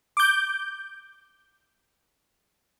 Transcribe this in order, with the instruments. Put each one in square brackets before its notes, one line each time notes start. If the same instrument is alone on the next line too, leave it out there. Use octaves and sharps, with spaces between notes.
[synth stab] D6 G6